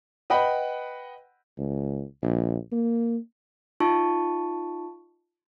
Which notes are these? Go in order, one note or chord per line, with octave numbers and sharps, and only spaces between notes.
B4 D#5 F#5 G5 B5
C#2
A#1
A#3
D#4 F4 A5 C#6